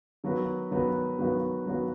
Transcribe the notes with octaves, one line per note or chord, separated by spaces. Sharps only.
D#3 F#3 B3 F#4 B4
D#3 F#3 B3 F#4 B4
D#3 F#3 B3 F#4 B4
D#3 F#3 B3 F#4 B4